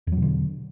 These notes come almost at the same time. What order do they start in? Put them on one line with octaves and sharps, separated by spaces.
E2 F#3 B2 D3